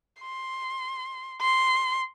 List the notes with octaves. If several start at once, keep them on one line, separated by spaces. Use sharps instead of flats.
C6
C6